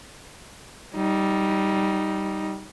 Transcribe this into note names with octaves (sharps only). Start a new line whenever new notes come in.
G3 D#4